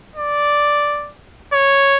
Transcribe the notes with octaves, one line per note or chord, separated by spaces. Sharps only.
D5
C#5